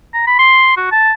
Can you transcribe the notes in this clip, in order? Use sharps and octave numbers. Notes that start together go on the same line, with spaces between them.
A#5
B5
C6
F#4
A5